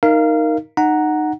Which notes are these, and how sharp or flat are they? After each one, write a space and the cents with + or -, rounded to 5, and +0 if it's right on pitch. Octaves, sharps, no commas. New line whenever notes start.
D#4 +0 A#4 +0 F5 -20
D#4 -20 F#5 +0 A#5 +0